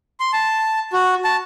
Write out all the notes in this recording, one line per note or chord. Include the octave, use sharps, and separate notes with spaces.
C6
A5
F#4
A5